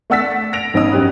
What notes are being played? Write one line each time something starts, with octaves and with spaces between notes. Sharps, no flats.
A3 D5 F#5 E6 A6 B6
A#6 D7 F7
G#1 C#4 D#4 D#5 D#6
F#2 C#4 G4 F#6